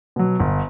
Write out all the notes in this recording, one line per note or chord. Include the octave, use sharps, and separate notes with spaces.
B2 F#3
G1